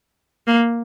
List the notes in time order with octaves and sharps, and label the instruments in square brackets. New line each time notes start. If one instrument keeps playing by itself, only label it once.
[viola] A#3